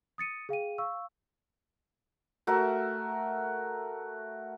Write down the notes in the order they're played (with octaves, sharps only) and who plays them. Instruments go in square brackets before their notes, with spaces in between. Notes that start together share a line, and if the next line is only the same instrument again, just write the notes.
[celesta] D#6 A6 C#7 D#7
G#4 F5 G5 D#7
F5 C#6 E6
[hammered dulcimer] A3 F#4 A#4 E5